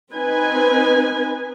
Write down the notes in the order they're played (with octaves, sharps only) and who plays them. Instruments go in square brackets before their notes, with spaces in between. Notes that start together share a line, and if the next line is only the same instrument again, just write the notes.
[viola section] C4 D#4 B4 G#5